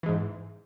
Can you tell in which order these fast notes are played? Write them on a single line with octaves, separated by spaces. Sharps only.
E3 G#3 G#2